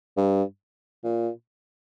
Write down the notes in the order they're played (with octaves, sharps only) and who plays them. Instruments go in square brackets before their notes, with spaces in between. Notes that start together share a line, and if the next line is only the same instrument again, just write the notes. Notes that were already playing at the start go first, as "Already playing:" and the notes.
[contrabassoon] G2
A#2